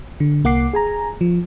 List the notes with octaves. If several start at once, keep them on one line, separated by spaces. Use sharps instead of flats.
D3
C2 A#3 F#5 D6 C7
G#4 G#5 A#5
F3